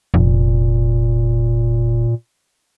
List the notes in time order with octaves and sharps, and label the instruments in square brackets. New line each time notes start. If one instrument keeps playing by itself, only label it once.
[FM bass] F1 [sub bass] A#2